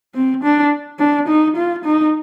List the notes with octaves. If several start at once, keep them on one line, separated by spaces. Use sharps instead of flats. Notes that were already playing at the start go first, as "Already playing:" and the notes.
C4
D4
D4
D#4
F4
D#4